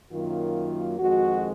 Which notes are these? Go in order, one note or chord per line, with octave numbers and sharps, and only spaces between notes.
F#2 D#3 F#3 A#3 F4
F2 D#3 G#3 F#4